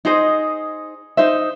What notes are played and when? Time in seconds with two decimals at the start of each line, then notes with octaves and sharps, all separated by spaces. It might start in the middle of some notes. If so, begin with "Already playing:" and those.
0.05 D#4 G#4 C5 D#5
1.17 D#4 C5 E5